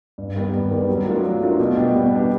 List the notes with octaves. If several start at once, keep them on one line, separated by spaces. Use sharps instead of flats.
G2
D#3 G3 B3
G2
D#3 G3 B3
F#3
A3 D4 F4 A#4
F#3
A3 D4 F4 A#4
B2
G3 B3 D4 G4
B2
G3 B3 D4 G4